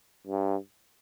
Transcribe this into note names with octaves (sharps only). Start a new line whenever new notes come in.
G2